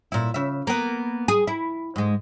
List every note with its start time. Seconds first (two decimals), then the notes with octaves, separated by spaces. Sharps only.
0.12 A#2 E4
0.34 C#3 E5
0.67 A#3 B3
1.28 G#4
1.47 E4
1.96 G#2 G#3